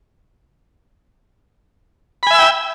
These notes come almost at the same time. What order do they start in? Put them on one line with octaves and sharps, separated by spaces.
B5 G#5 E5 E6 G5